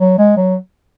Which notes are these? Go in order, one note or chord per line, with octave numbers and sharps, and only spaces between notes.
F#3
G#3
F#3